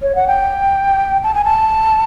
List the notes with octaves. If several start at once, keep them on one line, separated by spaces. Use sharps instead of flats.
C#5
F#5
G5
A5
G#5
A5